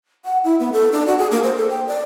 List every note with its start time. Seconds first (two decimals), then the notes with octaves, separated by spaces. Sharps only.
0.25 F#5
0.44 E4
0.60 B3
0.73 A4
0.92 D4
1.07 F#4
1.19 G#4
1.31 A#3
1.43 C5
1.57 A4
1.70 G5
1.87 D5